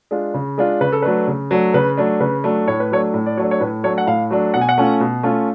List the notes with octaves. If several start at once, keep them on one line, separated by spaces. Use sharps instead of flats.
G#3 D4 F4
C#3
G#3 D4 F4
C#3 B4
A4
F#3 A3 D4 B4
C#3
F#3 A3 D4
C#3 B4
F#3 A3 D4
C#3 B4
F#3 A3 D4
A2 C#5
B4
F#3 A3 D4 C#5
A2
D5
F#3 A3 D4 C#5
C#5
A2 B4
F#3 A3 D4 C#5
F#5
A2 F5
F#3 A3 D4
B2 F#5
G#5
F#5
A3 C#4 F4
B2
A3 C#4 F4